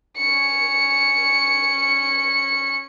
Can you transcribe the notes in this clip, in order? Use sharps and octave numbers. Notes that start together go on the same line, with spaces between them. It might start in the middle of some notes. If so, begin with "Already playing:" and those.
C#4 C#7